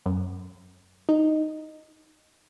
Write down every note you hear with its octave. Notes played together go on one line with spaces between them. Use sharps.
F#2
D#4